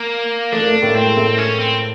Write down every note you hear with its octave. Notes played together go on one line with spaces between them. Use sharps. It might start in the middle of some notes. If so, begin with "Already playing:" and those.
Already playing: A#3
A3 D4
A#3
A3
A#3
A2 A3
A3 C4
G#3
A2 A3
C#4
C4